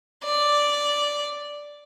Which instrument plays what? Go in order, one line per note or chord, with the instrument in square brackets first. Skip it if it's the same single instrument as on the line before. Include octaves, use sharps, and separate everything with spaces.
[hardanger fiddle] D5